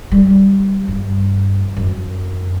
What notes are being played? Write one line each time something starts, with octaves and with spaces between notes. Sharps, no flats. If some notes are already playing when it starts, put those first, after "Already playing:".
G3
G2
F#2